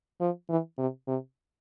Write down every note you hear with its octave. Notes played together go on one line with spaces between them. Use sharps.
F3
E3
C3
C3